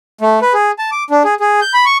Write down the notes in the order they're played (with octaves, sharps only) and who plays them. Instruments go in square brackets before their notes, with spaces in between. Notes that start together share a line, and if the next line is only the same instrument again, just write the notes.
[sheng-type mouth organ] A3
B4
G#4
A5
D6
D4
G#4
G#4
G6
B5
C#6